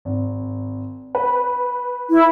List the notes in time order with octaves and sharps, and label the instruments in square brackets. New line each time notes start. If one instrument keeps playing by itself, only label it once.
[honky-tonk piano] G#1
B4
[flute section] E4